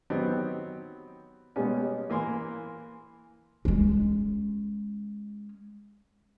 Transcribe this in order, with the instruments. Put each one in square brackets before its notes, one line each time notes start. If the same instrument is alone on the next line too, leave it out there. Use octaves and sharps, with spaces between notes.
[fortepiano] D#3 F#3 B3 C4 G4
B2 G3 G#3 A#3 B3 C#4
E3 A#3 G#5 C6
[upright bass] G#3 C#4